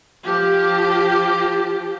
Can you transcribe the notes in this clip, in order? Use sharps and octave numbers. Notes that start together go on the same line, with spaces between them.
F3 G4